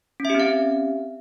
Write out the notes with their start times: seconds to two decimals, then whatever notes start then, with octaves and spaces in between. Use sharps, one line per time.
0.20 C#4
0.25 E5
0.30 G4
0.35 C4
0.40 F5